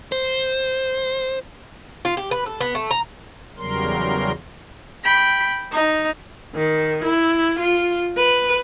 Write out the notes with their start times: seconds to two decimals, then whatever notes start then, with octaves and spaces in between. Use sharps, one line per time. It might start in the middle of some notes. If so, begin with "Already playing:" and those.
0.12 C5
2.05 F4
2.17 G4
2.31 B4
2.46 A4
2.61 B3
2.75 A3
2.91 A#5
3.58 E2 C#3 F#3 G3 A#4 C6
5.04 G5 B5
5.72 D#4
6.55 D#3
7.04 E4
7.59 F4
8.17 B4